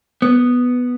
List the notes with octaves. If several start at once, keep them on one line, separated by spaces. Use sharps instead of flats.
B3